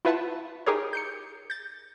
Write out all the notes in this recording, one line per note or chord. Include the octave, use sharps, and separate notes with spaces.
E4 F4 B4 E5 F#5 A5
D#4 G4 G#4 A#4 C#5
G6 C7 C#7
G6 A6